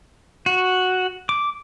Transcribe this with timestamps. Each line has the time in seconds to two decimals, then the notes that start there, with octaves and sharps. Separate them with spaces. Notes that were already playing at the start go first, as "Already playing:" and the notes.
0.46 F#4
1.29 D6